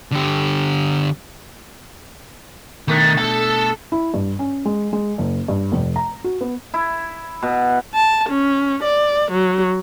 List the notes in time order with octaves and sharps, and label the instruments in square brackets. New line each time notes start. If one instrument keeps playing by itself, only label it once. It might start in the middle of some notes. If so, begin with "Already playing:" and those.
[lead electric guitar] D3 G4
[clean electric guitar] B2 A3 D4 [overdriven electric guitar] D#3
[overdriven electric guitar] A4 A5
[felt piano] E4
G2
C#4
G#3
G#3
F#1
G2
F1
A#5
F#4
B3
[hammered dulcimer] E4
B2
[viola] A5
C#4
D5
F#3